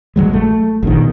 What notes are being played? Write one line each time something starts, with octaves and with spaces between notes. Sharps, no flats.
A1 B2 F#3 G#3
A3
A#1 B2 D#3